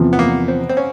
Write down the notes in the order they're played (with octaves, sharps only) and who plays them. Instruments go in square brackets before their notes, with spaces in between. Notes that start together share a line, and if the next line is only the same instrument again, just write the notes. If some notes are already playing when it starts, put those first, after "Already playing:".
Already playing: [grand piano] E2 C3 F3
[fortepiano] B3
A#3
C4
C4
C#4